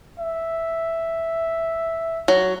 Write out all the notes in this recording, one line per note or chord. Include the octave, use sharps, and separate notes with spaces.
E5
F#3